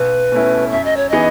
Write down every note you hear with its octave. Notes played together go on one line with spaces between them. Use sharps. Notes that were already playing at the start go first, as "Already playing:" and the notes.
Already playing: B1 B4
B2 A3 C#4 E4
F#2 E5
D#5
C#5
E3 B3 D#4 G#4 D#5